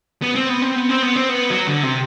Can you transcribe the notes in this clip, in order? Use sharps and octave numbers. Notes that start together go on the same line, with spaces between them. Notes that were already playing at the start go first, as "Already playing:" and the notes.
B3
C4
B3
C4
B3
C4
B3
C4
B3
F#3
D3
C3